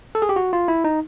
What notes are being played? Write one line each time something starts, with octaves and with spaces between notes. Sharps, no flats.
A4
G#4
G4
F#4
F4
E4
D#4